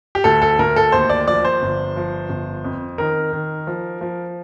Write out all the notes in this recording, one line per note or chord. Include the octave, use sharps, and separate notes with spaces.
G4
D2 A4
A4
D2 A#4
A4
D#2 C5
D5
F3 D5
C5
G1
F3
G1
F2
D#3 A#4
D#3
F3
F3